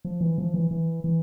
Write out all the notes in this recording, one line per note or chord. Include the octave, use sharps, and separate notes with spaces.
F3
E3
F3
E3
E3
E3